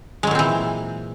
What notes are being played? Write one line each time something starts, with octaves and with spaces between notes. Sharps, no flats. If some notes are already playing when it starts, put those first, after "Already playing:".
A#2 E3 F#3 G#3 C4